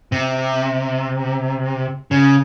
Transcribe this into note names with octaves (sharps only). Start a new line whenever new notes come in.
C3
C#3